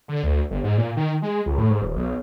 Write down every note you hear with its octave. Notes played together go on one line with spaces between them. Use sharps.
D3
D2
G1
G#2
A#2
D#3
G#3
C#2
A2
G#2
D#1
B1